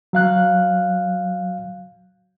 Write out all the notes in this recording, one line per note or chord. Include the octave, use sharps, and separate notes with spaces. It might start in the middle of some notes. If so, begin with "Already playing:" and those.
F#3 F5 F#6